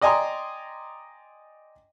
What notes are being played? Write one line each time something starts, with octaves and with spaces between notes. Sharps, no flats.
D5 D#5 G5 G#5 A#5 C6